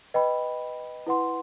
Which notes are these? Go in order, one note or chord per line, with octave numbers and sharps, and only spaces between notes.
B4 D#5 G5 B5
E4 B4 F#5 C6